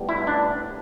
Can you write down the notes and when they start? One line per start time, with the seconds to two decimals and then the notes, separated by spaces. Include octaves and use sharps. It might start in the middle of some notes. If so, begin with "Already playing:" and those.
Already playing: A2 G3 B3
0.09 E4
0.27 D4